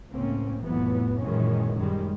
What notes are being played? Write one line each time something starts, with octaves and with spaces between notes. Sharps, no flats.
C#2 A2 A#3 C4 C#4
F1 A2 E3 F#3 B3
F#2 A#2 D#3 E3 G#3 C#4
F#2 D#3 G3 G#3